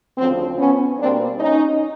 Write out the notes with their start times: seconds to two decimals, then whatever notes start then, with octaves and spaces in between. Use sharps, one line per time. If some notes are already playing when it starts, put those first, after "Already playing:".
0.18 D2 C#3 F3 C4
0.58 B3 C#4
0.99 B2 G3 A#3 C4 D4
1.39 C#4 D#4